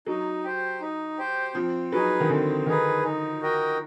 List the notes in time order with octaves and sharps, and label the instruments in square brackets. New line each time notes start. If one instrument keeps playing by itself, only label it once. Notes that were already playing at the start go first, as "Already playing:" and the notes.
[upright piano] F#3 [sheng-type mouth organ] D#4
[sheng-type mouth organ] G4 C5
D#4
G4 C5
[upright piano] F3 [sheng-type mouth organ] C4
[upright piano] F#3 [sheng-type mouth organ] D#4 G#4 B4
[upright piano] D#3
[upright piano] D3 [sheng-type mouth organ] C4
[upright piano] D#3 [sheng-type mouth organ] D#4 G#4 B4
[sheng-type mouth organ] D#4
F#4 A#4 D#5 G5